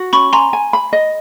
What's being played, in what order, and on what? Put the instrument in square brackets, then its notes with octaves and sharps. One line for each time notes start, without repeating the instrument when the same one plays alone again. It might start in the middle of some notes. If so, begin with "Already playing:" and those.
Already playing: [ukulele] F#4
[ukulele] C#4 [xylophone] B5 C#6
[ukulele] G#5 [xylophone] A#5 C6
[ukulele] G#5
B5
D#5